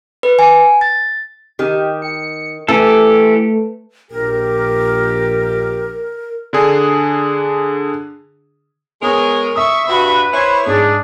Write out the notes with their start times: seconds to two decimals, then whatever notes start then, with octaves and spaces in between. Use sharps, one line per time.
0.23 B4
0.39 G#5
0.81 A6
1.59 D#3 G4
2.02 C#7
2.68 E3 A3 G4 A4
4.11 A#1 G4 A#4
6.53 D3 D4 G#4
9.02 G#3 B3 A#4 C#5 D#6
9.55 E5 C#6 D#6
9.89 G2 F#4 B4 B5
10.34 E4 C5 C#5
10.66 G#2 G#3 D4 G#4